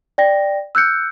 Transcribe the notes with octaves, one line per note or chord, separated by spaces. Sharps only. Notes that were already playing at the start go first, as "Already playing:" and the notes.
D5 G5 A#6
E6 F#6 G6 C#7